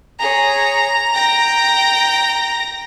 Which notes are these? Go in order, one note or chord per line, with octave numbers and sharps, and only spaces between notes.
G#4 C#5 A#5
G5 A#6